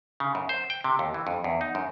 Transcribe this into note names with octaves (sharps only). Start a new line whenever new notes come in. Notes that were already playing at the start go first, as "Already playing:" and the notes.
C#3
F#2
C5
G5
C3
D#2
E3
F2
E2
D#4
F#2